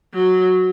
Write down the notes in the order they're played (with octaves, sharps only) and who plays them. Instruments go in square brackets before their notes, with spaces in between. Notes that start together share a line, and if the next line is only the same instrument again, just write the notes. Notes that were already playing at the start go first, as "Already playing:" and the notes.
[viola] F#3